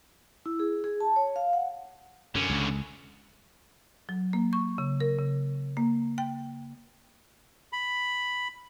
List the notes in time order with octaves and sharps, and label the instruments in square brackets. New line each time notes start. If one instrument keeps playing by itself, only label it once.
[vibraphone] E4
G#4
G#4
A5
C#5
F5
F#5
[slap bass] F#2 [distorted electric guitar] D3 C#4
[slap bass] C#2
[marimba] F#3
A#3
C#6
C#3
A#4
C#3
A#3
G5
[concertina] B5